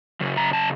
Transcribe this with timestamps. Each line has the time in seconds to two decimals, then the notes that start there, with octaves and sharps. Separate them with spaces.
0.20 F#2 C#3
0.37 A#5
0.53 A5